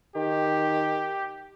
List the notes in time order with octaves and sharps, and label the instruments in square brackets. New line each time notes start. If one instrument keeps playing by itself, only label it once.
[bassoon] D#3 [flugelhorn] G4